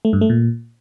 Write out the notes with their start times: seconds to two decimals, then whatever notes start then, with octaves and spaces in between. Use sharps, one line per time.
0.05 A3
0.13 G2
0.21 A3
0.30 A#2